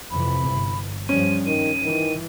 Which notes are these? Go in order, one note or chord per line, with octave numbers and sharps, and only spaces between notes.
F2 C3 E3 B5
G1
G2 F3 G3 C#4 D#7
G2 D#3 D#7
D#3 E3